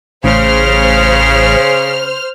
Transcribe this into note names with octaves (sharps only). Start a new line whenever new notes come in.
A1 C#3 C5 F6